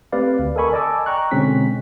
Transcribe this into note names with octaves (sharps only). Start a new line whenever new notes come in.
A3 C4 G4 B4 D5 F5
D2
A4 A#4 D#5 G#5 B5 C#6
D5 D#5 G#5 A5 D6 E6
G5 A#5 C#6 F#6
B2 D3 G#3 C4 C#4 B6